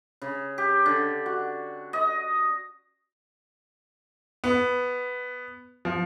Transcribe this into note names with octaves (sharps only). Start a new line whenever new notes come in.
C#3
G4
D3
F#4
D#5
B3
F3